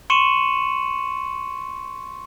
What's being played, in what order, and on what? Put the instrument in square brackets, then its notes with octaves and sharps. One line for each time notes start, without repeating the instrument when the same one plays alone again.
[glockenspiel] C6 C#6 C#7 D#7 E7 F#7